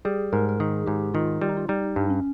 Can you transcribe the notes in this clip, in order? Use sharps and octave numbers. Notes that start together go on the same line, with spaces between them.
G3 G#4
G#2 A#4
A#4
D#3 G#4
G#2 G4
D#3 F4
G3 F4
D#4
F4
G3 D#4
G2
C#4